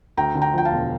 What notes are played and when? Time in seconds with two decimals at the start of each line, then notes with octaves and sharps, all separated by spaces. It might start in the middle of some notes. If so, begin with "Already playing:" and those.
0.17 D2 G5 A#5
0.35 D3
0.42 G5 A#5
0.54 F3 G5
0.65 F5 A5
0.71 E1